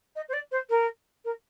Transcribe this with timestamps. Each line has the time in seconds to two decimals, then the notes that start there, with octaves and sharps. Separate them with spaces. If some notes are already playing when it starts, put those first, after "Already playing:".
0.16 D#5
0.29 C5
0.33 D5
0.51 C5
0.70 A#4
1.25 A#4